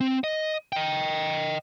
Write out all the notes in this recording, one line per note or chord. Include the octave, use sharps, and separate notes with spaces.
C4
D#5
D#5 G5